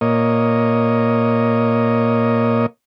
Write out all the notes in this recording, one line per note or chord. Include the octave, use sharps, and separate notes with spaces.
A#2 A#3 C#5 D#5